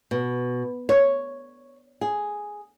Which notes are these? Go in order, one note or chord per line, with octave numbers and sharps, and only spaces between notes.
B2
C#5
G#4